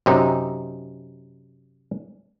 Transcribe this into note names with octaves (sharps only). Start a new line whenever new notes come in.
F#2 C3 D#4